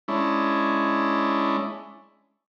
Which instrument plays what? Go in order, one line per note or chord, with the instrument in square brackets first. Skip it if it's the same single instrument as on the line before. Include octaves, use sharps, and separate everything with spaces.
[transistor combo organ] G#3 C#4 D4 E4